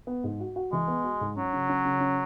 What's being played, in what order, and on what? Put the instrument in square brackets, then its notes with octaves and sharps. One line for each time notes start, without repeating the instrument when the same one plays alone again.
[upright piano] B3
G#2
F#4
F#4
[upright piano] E3 [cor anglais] G#3
[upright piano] B3
F#4
G#2
[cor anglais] F#3 [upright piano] C#4
[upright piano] C#3
C#4
C#3
C#4